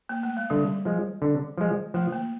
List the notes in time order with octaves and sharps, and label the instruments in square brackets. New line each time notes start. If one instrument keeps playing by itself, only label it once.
[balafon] A#3
A3
G#3
[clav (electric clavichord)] D3 [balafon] G3
[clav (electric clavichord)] F3 G#3
D3
F3 G#3
[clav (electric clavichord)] F3 [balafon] A3
[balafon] A#3